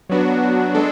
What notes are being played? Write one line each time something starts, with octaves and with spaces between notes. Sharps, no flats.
F#3 B3 D4 F#4
G#3 D4 A4